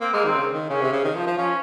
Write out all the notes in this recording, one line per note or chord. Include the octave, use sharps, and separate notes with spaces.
A#3 C4
G#3 A#3
D#3 C4
C#3
D#3
C#3 C#4
C3
C#3
D#3
F3
F3
F3 C#4